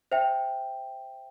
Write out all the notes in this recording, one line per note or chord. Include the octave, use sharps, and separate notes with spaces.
C5 E5 G5